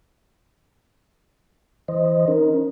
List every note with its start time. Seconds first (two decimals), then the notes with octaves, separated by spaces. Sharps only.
1.88 E3 C5 D#5
2.28 C#4 D#4 A#4